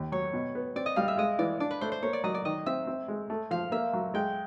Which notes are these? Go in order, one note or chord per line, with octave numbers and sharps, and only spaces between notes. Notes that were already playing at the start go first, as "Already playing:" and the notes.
Already playing: D#2
F#3 C#5
B2
B3
C4 D5
D#5
G3 F5
E5
G#3 D#5
E3 D5
D4 D5
B4
A3 C5
C5
A#3 C#5
D5
F#3 D#5
D5
D#3 D#5
C4 E5
C4
G#3
A3
F3 F5
A#3 E5
F#3
G#3 G5